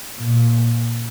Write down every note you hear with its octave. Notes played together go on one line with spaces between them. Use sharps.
A#2